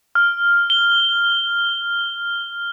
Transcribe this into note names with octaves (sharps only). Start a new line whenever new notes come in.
F6
G7